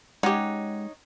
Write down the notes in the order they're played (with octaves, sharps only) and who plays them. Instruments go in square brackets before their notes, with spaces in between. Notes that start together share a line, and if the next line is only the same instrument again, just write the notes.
[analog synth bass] G#3 [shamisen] C#4 G4 [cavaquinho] D#4 C#5 [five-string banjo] F#5